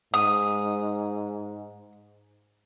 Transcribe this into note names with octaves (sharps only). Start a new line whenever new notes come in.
G#2 D#6